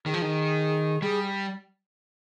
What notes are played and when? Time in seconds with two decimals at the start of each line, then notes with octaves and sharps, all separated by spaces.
0.06 D#3 G#4
0.14 F3
0.22 D#3
1.02 G3 G#4